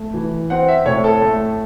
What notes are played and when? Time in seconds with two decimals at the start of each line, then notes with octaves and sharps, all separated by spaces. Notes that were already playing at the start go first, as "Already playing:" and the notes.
Already playing: A3
0.14 E3
0.50 C4 F#5
0.68 E5
0.86 A2 C#5
1.04 A4
1.22 A3